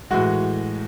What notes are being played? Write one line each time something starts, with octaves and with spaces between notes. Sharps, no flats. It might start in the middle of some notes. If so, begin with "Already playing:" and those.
A2 E3 G#3 F#4